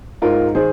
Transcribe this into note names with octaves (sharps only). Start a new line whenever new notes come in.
G#2 F4 A#4
D#3 G#4 C5